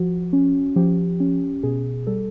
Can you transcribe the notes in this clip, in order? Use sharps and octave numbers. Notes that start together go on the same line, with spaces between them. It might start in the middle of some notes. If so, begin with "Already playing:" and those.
Already playing: F3 F#4
C#4
F3 G4
C#4
B2 G#4
G3 A4